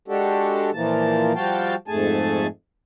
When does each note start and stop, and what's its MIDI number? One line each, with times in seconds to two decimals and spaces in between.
0.08 0.70 56
0.08 0.70 62
0.08 0.70 66
0.08 0.70 67
0.08 0.70 69
0.73 1.33 46
0.73 1.33 52
0.73 1.33 53
0.73 1.33 58
0.73 1.33 81
1.35 1.75 53
1.35 1.75 55
1.35 1.75 66
1.35 1.75 77
1.35 1.75 79
1.35 1.75 81
1.88 2.47 41
1.88 2.47 44
1.88 2.47 57
1.88 2.47 68
1.88 2.47 80
1.88 2.47 81